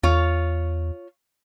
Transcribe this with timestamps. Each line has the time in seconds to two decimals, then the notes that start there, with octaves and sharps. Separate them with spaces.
0.03 E2 F4 C#5